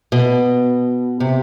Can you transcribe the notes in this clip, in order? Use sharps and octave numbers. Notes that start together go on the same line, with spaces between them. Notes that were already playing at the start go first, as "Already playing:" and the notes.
B2
C3